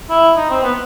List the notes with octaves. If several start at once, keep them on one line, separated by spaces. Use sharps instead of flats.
E4
D#4
C4
B3